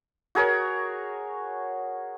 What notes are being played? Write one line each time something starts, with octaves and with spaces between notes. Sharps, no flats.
F#4 G#4 A#4 C#5